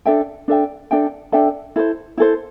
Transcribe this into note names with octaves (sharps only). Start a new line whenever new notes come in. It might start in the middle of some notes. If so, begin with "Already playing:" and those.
D4 A4 E5 G5
D4 A4 E5 G5
D4 A4 E5 G5
D4 A4 E5 G5
E4 A4 C5
E4 A4 C5